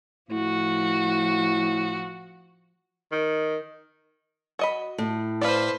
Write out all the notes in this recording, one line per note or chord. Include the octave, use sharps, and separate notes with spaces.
A2 F3 F#4
D#3
F#4 D#5 B5
A2
B4 C5 D5 F5